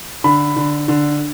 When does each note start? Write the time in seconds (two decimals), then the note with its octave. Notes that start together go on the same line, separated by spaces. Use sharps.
0.24 D3 B5
0.56 D3
0.88 D3